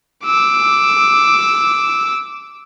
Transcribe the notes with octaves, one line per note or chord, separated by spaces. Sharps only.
D6 E6